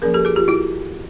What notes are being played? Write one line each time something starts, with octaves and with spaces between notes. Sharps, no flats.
F3 A#3 C#4 G#4 A#4
G4 A4
F#4 G#4
F4 G4
E4 F#4